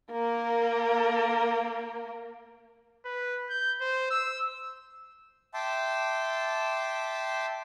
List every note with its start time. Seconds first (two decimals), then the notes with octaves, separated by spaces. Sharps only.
0.12 A#3 A#4
3.05 B4
3.49 G6
3.81 C5
4.11 E6
5.54 E5 G5 A5 C6 D6